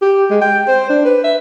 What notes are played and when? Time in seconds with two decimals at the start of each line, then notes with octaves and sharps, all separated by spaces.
0.01 G4
0.30 G#3
0.41 G5
0.67 C5
0.89 D4
1.05 B4
1.24 E5